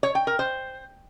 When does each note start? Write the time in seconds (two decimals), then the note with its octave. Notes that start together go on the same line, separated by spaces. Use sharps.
0.03 C#5
0.15 G5
0.27 A#4
0.39 C5